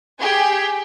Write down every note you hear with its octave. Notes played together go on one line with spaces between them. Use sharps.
G4 G#4 G5